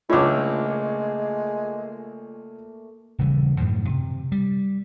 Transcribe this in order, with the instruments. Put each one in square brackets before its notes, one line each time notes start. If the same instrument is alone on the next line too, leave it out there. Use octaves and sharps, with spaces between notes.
[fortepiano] C#2 D4 C#5 [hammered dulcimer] A#2 A3 [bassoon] G#3 [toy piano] F4 D6
[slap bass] D#1 C#3 E3 G3
F#2 A2 D#3 F3
C3
G3